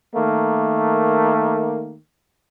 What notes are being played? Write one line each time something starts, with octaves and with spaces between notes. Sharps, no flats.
D#3 A3 A#3